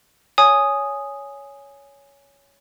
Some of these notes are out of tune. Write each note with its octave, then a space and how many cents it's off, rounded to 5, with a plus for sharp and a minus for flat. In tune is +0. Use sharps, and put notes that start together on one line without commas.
C#5 +15 G#5 +0 D#6 +0